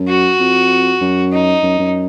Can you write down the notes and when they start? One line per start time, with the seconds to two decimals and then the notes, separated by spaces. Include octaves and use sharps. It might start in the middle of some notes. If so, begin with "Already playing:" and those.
Already playing: F#2
0.08 F#4
0.40 F2
1.01 F#2
1.32 D#4
1.63 F#2
1.79 F#2